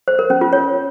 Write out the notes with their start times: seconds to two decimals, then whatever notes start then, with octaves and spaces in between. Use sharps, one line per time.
0.08 C5
0.19 A#4
0.30 C#4
0.41 F4
0.53 C#5